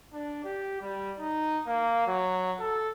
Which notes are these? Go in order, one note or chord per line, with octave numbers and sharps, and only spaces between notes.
D4
G4
G3
D#4
A#3
F#3
A4